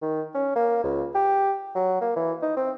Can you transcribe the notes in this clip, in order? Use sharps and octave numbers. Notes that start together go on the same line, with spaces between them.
D#3
C#4
A#3
C#2
G4
F#3
A#3
E3
D#4
C4